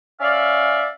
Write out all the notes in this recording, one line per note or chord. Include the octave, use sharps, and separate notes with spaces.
C#4 D5 E5 F5